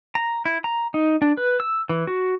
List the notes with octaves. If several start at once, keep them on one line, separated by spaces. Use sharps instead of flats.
A#5
E4
A#5
D#4
D4
B4
E6
E3
F#4